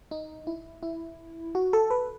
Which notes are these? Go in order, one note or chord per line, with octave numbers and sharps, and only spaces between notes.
D#4
E4
E4
F#4
A4
B4